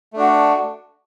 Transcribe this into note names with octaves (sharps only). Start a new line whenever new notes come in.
A3 D4 F#4